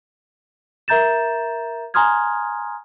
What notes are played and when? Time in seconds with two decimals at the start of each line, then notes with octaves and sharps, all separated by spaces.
0.88 A#4 E5 A#5 G6 A6 E7
1.94 G#5 A#5 C6 D#6 F6 G#6